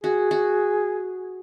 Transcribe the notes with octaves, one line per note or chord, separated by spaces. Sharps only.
F#4 G#4
F#4